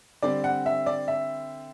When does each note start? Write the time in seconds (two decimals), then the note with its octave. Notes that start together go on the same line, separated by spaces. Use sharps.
0.23 D3 G3 C4 D5
0.44 F#5
0.66 E5
0.86 D5
1.08 E5